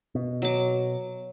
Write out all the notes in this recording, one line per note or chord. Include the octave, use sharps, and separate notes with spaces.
B2
F#3 D6